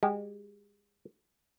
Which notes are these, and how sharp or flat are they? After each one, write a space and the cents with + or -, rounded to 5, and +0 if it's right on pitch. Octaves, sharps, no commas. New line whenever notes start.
G#3 -30 G4 -30